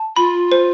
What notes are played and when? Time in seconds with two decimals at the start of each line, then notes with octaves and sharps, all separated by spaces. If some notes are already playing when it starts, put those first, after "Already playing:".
Already playing: A5
0.16 F4 B5
0.52 C5